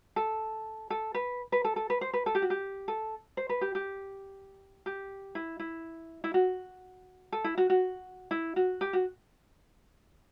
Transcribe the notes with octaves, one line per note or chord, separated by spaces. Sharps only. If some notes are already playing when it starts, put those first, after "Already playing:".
A4
A4
B4
B4
A4
A4
B4
C5
B4
A4
G4
F#4
G4
A4
C5
B4
G4
G4
G4
E4
E4
E4
F#4
A4
E4
F#4
F#4
E4
F#4
G4
F#4